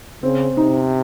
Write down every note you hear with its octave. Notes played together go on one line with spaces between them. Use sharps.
C#3 C4
C3 D#4